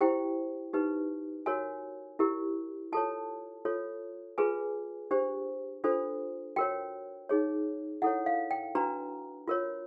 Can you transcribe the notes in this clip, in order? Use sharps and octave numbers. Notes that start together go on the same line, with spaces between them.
E4 G4 C5 G5
D#4 G4 B4
F#4 A#4 C#5 G#5
E4 G4 A#4
F4 A4 C#5 A5
F4 A4 C#5
F4 G#4 B4 G#5
D4 G4 C5
D4 F4 A4 C5
F#4 A#4 C#5 G5
D#4 G#4 C#5
E4 A4 C#5 F#5
F5
G5
D4 F#4 B4 A#5
F4 A#4 C#5